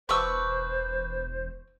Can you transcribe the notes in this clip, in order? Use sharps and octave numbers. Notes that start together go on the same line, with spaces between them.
E1 B4 C5 D5 A5 C#6 E6